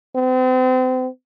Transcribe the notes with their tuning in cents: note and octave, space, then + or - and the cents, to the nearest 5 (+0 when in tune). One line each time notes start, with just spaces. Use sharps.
C4 -35